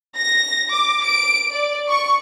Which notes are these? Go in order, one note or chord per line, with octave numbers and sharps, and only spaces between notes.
A#6
D6
D7
D5
C#6